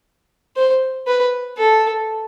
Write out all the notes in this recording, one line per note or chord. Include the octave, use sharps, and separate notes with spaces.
C5
B4
A4